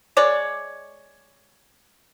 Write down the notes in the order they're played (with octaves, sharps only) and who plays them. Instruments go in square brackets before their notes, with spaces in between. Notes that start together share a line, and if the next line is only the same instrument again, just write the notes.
[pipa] G#3 C#5 D5